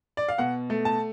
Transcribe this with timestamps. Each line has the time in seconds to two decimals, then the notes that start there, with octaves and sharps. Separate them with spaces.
0.17 D5
0.28 F5
0.38 B2 F#5
0.70 A3
0.85 A5